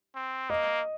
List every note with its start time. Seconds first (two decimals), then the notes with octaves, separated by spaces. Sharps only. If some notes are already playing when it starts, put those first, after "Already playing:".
0.15 C4
0.50 A#3 D#5